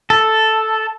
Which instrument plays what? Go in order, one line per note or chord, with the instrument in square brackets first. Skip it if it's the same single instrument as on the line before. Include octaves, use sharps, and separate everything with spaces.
[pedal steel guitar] A4